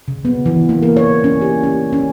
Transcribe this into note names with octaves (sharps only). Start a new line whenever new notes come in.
C#3
B3
E3
A#3
A#4
C#5
C#4
G4
C#4
C#4